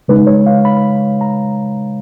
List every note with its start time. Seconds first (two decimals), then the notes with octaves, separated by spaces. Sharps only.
0.08 C#3 G#3 D#4 B4
0.27 C#5
0.46 F5
0.65 B5
1.21 A#5